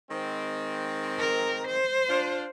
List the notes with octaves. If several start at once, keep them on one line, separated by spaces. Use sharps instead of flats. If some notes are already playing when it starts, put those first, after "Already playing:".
D#3 G#3 C4
A#4
C5
D4 F4